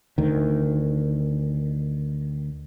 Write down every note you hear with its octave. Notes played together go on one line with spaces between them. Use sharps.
D2 D#3